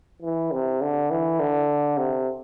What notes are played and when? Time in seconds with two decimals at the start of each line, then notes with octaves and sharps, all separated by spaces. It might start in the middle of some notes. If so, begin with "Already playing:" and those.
0.22 E3
0.52 C3
0.82 D3
1.11 E3
1.40 D3
1.97 C3